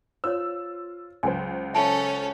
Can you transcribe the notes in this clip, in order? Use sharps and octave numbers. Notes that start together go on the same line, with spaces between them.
F4 C5 C#5 E6
C#2 F#3 C5 G#5
C#4 A4 E5 A5 B5